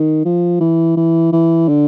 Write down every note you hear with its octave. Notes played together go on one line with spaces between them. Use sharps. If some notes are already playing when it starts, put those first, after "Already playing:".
Already playing: D#3
F3
E3
E3
E3
D3